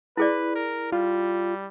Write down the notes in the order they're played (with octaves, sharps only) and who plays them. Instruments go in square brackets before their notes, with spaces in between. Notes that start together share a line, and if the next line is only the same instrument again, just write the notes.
[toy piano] E4 G#4 D5 [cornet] B4
[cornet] A#4
[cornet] G3 [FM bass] F4